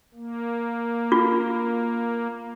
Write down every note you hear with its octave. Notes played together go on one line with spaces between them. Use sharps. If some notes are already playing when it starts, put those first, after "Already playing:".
A#3
F4